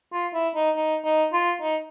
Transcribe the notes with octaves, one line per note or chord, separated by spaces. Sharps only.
F4
E4
D#4
D#4
D#4
F4
D#4